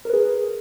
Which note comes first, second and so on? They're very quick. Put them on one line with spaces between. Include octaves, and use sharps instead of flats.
A#4 B4 G#4